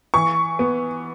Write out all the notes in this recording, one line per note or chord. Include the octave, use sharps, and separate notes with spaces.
E3 C#6
B3